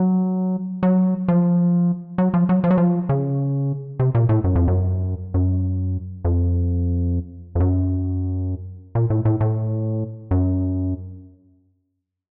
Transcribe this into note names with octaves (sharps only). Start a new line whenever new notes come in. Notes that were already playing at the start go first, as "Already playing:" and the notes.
Already playing: F#3
F#3
F3
F#3
F3
F#3
F3
F#3
F3
C#3
C3
A#2
A2
F#2
F2
F#2
F#2
F2
F2
F#2
A#2
A2
A2
A2
F#2